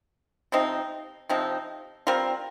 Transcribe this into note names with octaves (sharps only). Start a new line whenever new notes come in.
C3 F3 C4 D#4
C3 F3 C4 D#4
G3 C4 F4 A#4